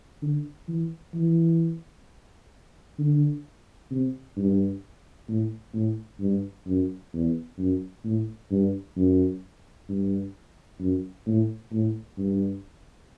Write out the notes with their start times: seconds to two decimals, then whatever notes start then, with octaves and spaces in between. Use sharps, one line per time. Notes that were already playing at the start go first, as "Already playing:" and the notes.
0.22 D3
0.68 E3
1.14 E3
2.99 D3
3.91 C3
4.37 G2
5.28 A2
5.74 A2
6.20 G2
6.67 F#2
7.13 E2
7.58 F#2
8.05 A2
8.51 G2
8.97 F#2
9.89 G2
10.80 F#2
11.27 A2
11.72 A2
12.18 G2